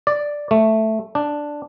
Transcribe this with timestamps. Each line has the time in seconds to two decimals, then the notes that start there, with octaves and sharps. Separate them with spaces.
0.07 D5
0.51 A3
1.15 D4